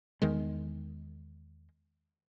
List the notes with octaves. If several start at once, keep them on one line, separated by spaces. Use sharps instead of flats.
E2 D#3 G#3